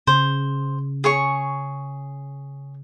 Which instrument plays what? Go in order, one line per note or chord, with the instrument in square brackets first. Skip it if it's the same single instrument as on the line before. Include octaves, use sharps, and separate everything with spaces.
[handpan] C#3 [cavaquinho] C5
[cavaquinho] G#4 C#5 C#6